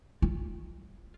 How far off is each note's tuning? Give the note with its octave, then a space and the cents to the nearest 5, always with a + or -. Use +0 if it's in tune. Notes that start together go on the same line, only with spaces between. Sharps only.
F4 -10